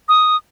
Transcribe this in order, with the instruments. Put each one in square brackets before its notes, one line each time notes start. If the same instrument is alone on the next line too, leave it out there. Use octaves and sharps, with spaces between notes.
[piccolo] D#6